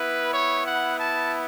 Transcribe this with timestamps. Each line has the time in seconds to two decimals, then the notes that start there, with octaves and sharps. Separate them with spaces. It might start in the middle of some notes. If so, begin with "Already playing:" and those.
Already playing: B3 E4 B4
0.32 C#5
0.65 F#5
0.98 A5